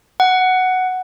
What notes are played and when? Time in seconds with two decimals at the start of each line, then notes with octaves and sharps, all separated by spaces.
0.20 F#5